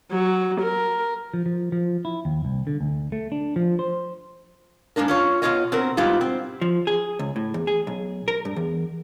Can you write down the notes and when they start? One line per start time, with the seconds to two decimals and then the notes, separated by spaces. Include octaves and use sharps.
0.10 F#3
0.60 A#4
1.34 F3
1.46 F3
1.72 F3
2.05 E4
2.25 D#2
2.45 C2
2.67 D3
2.81 D2
3.12 A3
3.32 D4
3.56 F3
3.79 C5
4.96 G#2 G#3 A#3 D4 A#4
5.08 C#4 F4 C#5
5.42 B2 E3 F4 C#5 D#5
5.72 B2 C4 A#4
5.97 G#2 B2 G3 E4 F4
6.21 C4
6.62 F3
6.87 G#4
7.19 C#2
7.36 A2
7.54 E2
7.67 G#4
7.87 B1
8.28 A#4
8.45 G2
8.56 E2